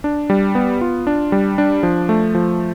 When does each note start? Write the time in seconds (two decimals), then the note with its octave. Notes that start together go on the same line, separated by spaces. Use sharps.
0.04 D4
0.30 G3
0.55 B3
0.81 F4
1.07 D4
1.32 G3
1.58 D4
1.83 F3
2.09 A3
2.35 F3